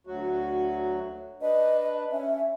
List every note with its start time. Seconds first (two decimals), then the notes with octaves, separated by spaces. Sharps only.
0.07 D2 F#3 F#4
1.42 D4 B4 D#5
2.12 C#4 E5